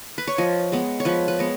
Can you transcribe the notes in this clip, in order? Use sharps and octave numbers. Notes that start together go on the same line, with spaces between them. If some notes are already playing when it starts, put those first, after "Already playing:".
B4
C#5
F3 D#5
G#3 B3
C#5
F3 B4
B4
G#3 B3